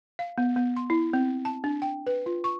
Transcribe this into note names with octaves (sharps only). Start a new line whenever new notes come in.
F5
B3
B3
C6
E4
C4
A5
D4
G5
B4
F4
C#6